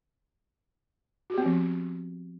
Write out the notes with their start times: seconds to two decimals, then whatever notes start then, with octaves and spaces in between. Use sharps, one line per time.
1.30 F#4
1.34 G4
1.38 B3
1.42 C4
1.46 F3